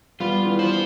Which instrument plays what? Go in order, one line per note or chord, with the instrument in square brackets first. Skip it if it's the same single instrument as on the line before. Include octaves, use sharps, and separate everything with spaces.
[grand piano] G3 B3 [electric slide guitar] F4
[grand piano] E3 G3
[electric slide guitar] C5